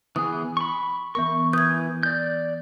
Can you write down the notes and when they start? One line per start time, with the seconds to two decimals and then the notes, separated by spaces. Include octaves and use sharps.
0.16 E3 B3 G#4 D#6
0.57 B5 C#6
1.15 E3 B3 A#4 C#6
1.53 E3 B4 D#6 G6 G#6
2.03 D5 G6